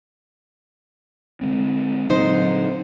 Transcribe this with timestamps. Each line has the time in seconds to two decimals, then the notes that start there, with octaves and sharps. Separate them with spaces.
1.41 D3 G#3 C4
2.09 A#2 D3 F#3 C4 D#4 C5